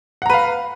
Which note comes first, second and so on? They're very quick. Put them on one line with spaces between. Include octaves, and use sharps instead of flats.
F#5 A#5 B4 F5